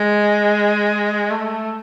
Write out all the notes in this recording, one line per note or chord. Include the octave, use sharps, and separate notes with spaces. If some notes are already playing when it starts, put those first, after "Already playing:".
Already playing: G#3
A3